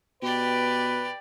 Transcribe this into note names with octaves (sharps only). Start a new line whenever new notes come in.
B2 G4 B4 D5